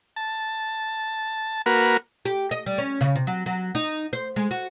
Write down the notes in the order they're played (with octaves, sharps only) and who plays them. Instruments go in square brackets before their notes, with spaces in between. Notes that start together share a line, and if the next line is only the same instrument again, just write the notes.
[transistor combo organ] A5
A#3 F#4 A#4 B4
[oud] G4
D#5
G3
C#4
C#3
C3
F#3
F#3
D#4
C5
G#3
F#4